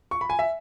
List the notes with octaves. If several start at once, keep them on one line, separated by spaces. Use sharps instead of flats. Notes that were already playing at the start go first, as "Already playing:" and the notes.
C#6
B5
G#5
E5